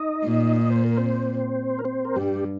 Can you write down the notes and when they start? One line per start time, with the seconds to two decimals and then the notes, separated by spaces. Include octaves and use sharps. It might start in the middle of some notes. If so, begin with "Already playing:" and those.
Already playing: D#4 D#5
0.24 A#2
0.56 D#5
0.70 C5
0.85 A#4
0.97 C4 C5
1.79 A#4
1.85 C4 C5
2.05 A#4
2.16 G2 G3 G4